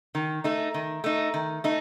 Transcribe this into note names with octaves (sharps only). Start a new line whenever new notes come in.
D#3
A3 D#4
D#3
A3 D#4
D#3
A3 D#4